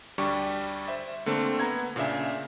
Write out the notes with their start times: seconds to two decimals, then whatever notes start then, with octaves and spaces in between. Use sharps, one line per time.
0.18 D2 G3 D4 G4 C#6
0.88 C5 E5
1.26 D3 A3 A#3 C4
1.59 B3 A#5 G#6
1.96 A#2 C#3 D4 E5